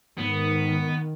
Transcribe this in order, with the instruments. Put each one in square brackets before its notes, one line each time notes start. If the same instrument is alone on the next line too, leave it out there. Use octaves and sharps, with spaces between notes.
[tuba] G#2 [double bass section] D#3 [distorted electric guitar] B3